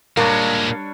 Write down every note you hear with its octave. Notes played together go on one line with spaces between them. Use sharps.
A#2 G3 G#3 A#3 D4 C#5